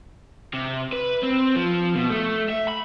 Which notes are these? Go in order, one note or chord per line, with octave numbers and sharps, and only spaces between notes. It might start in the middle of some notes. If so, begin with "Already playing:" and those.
C3
B4
C4
F3
B2
A3
E5
B5